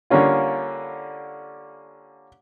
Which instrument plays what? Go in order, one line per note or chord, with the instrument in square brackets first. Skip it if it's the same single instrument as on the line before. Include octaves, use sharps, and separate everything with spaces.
[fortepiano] D3 G3 A#3 C#4 F4